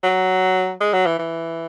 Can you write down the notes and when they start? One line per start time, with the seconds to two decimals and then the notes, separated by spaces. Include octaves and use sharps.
0.03 F#3
0.80 G#3
0.93 F#3
1.06 E3
1.19 E3